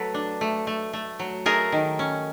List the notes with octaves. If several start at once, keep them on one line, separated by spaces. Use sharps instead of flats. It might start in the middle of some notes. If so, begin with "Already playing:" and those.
Already playing: F#3 A3 A4 B4
D4
A3
A3
A3
F#3
A3 G#4 A#4
D#3
C#4